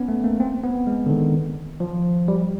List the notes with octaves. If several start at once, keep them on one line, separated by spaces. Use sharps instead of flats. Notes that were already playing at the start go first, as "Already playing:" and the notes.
Already playing: B3 C#4
A3
A#3
C4
B3
G#3
D3
D#3
F3
G3